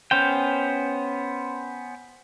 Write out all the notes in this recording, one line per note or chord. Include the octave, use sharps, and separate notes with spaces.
B3 C#4 C5 G5